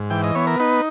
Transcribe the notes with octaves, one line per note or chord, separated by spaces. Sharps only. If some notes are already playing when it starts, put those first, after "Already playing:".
Already playing: G#2
E3 G5
D#5
B3 C#5
A#4
D#4 B4